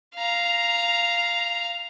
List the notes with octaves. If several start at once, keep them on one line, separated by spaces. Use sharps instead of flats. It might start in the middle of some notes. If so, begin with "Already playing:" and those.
F5 A#5